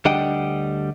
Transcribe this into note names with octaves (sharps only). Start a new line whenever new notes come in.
D2 G3 D4 D#5 F#5 G5